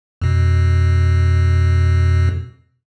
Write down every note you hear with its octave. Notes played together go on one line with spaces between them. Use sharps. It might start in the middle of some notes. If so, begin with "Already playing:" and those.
F2 B2